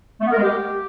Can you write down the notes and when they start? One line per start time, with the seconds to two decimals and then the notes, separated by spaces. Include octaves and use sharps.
0.20 A3
0.26 B3
0.31 A#4
0.37 G#3
0.42 G4